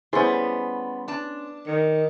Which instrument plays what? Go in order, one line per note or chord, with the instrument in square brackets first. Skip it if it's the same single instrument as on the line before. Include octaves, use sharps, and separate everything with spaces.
[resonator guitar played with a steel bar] G3 B3 [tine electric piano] C#4 C6 [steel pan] E4 G#4 C5
[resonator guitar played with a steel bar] D4 A5
[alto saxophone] D#3 [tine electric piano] C#7